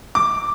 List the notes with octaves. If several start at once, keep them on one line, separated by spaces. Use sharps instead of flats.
D6